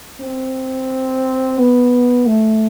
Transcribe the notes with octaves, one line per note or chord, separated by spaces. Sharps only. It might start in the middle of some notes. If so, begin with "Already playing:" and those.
C4
B3
A3